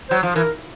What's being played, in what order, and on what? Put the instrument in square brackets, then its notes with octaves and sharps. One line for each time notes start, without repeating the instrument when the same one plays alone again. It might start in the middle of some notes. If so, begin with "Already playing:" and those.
[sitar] F#3 [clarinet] C5
[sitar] F3
[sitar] E3 [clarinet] A#4